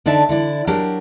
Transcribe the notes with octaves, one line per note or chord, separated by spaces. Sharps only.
D3 D4 D#4 D5 E5 A5
D3 E4 D5
F#3 D4 G4 A#4